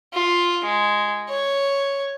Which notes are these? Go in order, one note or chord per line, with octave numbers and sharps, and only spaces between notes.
F4
G#3
C#5